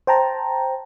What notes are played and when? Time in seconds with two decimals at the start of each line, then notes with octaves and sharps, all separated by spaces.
0.07 C5 G5 A5 A#5